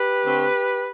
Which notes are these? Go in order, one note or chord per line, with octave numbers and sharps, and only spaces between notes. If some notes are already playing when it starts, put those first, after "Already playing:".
Already playing: G4 B4
D3 A3 C4